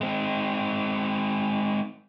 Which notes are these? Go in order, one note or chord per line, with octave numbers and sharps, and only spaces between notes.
G#3 C4